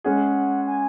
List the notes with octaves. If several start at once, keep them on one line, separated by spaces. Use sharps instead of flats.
G#3 C#4 G#4 F#5
G#5